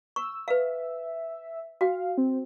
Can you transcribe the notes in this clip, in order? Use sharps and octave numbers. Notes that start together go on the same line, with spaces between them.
C#6 E6
B4 E5 F5
F#4 F5 G5
C4